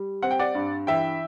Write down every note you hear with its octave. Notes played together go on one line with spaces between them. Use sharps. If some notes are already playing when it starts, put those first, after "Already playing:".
Already playing: G3
C4 F#5
G5
D5 F#5
G2
E3 E5 G5